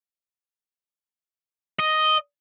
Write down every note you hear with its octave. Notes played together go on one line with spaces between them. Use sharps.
D#5